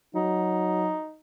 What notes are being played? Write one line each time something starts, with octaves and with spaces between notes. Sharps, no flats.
F#3 D#4